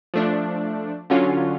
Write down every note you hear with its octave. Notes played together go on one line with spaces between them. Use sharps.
F3 A3 D4
D3 F#3 C#4 F4